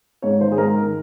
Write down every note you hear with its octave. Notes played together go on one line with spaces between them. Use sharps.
G#2 C#5
D#3 C5
G#4
G#2 A#4
D#3